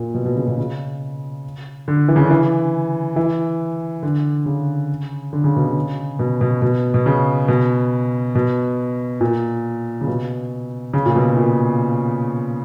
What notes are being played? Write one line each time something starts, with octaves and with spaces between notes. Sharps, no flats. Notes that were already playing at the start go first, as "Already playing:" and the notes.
Already playing: A#2
B2
B2
C#3
B2
C#3
D3
E3
C#3
D3
E3
E3
D3
C#3
D3
C#3
B2
C#3
B2
B2
B2
B2
C#3
B2
B2
A#2
C#3
B2
C#3
A#2
B2
A#2